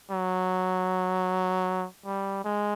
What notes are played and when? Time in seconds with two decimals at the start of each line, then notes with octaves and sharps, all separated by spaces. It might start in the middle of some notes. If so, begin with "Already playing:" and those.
0.11 F#3
2.05 G3
2.44 G#3